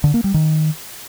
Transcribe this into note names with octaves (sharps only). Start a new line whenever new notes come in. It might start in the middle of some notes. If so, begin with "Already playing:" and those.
D3
A#3
G3
D#3